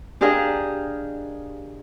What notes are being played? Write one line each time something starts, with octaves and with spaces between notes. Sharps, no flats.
D4 G4 G#4 A#4 D#5 F5